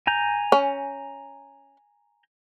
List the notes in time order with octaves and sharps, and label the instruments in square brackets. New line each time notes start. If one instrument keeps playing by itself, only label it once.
[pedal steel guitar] G#5 A#5 G6
[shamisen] C#4